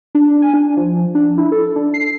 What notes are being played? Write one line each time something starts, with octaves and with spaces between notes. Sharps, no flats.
D4
G#5
D4
F3
D4
E4
A4
D4
C7